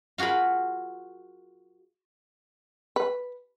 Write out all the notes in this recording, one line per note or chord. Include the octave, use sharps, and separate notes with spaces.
F4 F#4 G#4 A#4 B5
B4